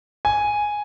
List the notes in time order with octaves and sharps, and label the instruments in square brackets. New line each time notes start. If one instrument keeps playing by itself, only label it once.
[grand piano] G#5